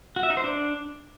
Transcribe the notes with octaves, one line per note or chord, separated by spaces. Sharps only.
F#4
E5
D#4
C5
D4